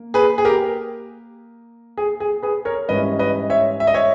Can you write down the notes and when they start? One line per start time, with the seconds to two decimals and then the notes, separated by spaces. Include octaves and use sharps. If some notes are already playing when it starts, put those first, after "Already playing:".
Already playing: A#3
0.14 G#4 B4
0.38 G#4
0.45 G4 A#4
1.97 G#4
2.20 G#4
2.42 G#4 B4
2.65 A#4 C#5
2.88 G#2 E3 G3 C#4 B4 D#5
3.19 B4 D#5
3.50 C#5 E5
3.80 E5
3.87 D#5
3.94 C#5 E5